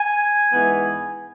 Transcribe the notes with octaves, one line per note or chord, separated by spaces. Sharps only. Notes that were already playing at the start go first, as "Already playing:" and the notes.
Already playing: G#5
G#2 E3 B3